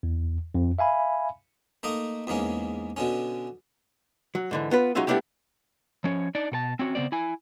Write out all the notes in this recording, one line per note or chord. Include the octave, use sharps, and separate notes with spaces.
E2
F2
E5 F5 G#5 B5
A3 A#3 D#4 D#5
E2 G#2 A#3 C#4
B2 D3 C#4
F#3
G#2 D3 E3
B3 F4 B4
F#3 G#3 C#4 D#4 F4 E5
G3 A3 B3 D4 E4 G4
F3 C#4 C#5
D4 D#4 D5
B2 A4 A5
C4 C#4 F#4
C#3 B3 C4 D5
E4 G#5